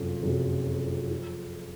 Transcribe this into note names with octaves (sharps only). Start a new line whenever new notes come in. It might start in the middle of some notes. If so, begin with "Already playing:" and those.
Already playing: F#1 F2 C3 F#3 C#4
F#1 F2 C3 F#3 C#4
F3